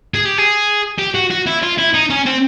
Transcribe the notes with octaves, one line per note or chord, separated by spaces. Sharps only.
G#4
G4
G#4
G4
F#4
F#4
E4
F4
E4
D#4
C#4
C4